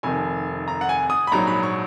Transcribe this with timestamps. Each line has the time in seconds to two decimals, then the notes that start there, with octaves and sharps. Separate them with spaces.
0.03 F1 F2 D#3 G#5
0.68 A#5
0.81 F#5
0.89 G#5
1.10 D#6
1.27 B5
1.32 A#1 G#2 F#3 A#5
1.47 B5
1.63 C#6